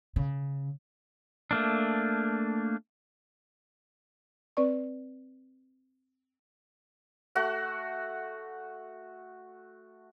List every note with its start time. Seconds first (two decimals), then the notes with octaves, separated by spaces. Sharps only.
0.16 C#3
1.51 A3 A#3 D4
4.57 C4 B4 D5 C#6
7.35 A3 F#4 F#5